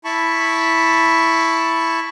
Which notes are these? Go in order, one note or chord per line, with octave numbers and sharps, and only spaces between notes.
E4 A5 B5 C#6